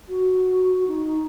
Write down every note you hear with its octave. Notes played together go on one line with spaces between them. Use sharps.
F#4
D#4